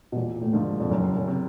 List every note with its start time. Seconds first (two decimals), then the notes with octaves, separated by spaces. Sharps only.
0.12 B2
0.16 E1 A#2
0.42 A2
0.53 D#2 G#2 D3 F3
0.80 F2
0.91 F#1 F#2
1.17 F#2
1.28 C3